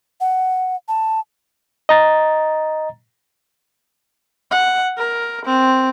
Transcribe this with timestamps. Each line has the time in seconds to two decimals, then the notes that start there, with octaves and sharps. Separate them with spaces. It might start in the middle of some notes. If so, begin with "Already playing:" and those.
0.21 F#5
0.88 A5
1.89 D#5 A#5 A6
4.51 F#5
4.98 A#4
5.45 C4